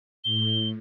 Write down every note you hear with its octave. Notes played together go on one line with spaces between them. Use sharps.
A2 G7